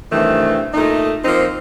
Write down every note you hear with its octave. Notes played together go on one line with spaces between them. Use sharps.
G2 C3 D#3 E3 A3
A#2 A3 D#4
F3 A#3 C4 D#4